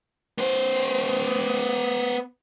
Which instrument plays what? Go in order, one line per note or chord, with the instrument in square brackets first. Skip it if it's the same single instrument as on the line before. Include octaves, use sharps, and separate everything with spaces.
[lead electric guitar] B3 C5